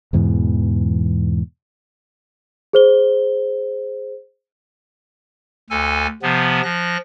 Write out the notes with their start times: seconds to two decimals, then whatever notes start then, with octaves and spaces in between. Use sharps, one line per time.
0.13 E2 G#2 B2 E3
2.73 G#4 C5 G7
5.70 D2 A4 G#5
6.22 C3 F3 B3
6.64 F3 F#6 A#6